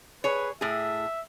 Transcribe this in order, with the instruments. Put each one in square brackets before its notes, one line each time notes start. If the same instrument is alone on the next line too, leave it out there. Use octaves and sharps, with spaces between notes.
[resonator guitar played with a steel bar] G#4 C#5 [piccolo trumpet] B4
[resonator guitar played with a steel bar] A2 G#4 [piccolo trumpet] E5